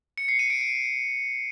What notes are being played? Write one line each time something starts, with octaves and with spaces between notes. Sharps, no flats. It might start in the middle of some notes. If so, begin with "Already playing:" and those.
C#7
C7
D#7
D7
D7